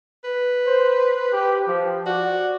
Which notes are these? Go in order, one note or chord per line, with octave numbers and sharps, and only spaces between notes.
B4
C5
G4
F3
F#4 D5